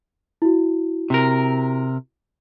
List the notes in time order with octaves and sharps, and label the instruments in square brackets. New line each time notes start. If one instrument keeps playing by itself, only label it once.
[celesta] E4 F#4
[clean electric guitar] C3 A#4